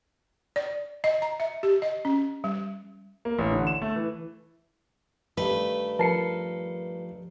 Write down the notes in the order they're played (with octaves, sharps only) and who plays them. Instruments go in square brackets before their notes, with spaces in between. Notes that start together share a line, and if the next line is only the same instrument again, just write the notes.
[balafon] D5
D#5
A#5
E5
G4
D#5
C#4
G3
[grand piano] A#3
A1
D3
E7
A3
E3
[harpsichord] G2 D#3 A3 [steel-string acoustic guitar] B4
[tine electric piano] F3 C7 C#7 [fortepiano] A#4 A5